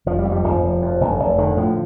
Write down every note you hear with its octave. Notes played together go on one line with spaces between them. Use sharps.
F1 F3
G3
F2
G3
F1 F3
F1
F2
F1
F1
D3 D#3
A2 F3